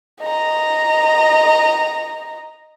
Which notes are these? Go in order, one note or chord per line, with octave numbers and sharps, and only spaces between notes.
D#5 A#5